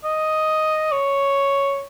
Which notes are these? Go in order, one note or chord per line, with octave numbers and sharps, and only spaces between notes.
D#5
C#5